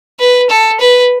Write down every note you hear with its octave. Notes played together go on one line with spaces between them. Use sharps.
B4
A4
B4